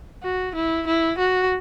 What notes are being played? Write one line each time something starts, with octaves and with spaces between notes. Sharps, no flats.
F#4
E4
E4
F#4